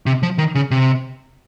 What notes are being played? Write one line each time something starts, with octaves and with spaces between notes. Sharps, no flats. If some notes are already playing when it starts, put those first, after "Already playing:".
C3
F3
D#3
C#3
C3